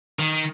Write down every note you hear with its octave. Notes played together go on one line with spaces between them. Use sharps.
D#3